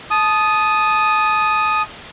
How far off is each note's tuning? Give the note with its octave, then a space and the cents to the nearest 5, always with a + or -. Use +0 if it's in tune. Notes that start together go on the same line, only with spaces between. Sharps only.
A5 -25 D#6 +0